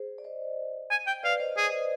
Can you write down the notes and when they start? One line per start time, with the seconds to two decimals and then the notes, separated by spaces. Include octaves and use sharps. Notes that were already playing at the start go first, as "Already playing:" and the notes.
Already playing: G#4 C5
0.18 D5
0.24 C5 D#5
0.91 G#5
1.07 G5
1.23 B4 D5 F5
1.40 C5 D#5
1.57 G#4